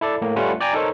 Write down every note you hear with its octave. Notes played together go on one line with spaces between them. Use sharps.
E4 A4 D5
A2 A#3
G3 A3 C#4 F4 B4 F#5
D5 G5 G#5 A#5
D#4 A4 A#4 C5 C#5